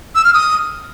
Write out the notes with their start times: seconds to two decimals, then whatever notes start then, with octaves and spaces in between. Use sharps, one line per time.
0.15 E6
0.25 F6
0.34 D#6